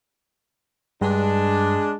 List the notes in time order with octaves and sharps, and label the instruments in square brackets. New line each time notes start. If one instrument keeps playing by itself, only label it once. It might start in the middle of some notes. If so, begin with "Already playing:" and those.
[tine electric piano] G2 [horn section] G#3 D4